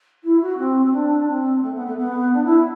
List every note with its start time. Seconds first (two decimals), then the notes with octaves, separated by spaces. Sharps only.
0.23 E4
0.40 F#4
0.57 C4
0.85 C4
0.92 D4
1.27 C4
1.62 A3
1.74 B3
1.86 A3
1.97 B3
2.33 D4
2.44 E4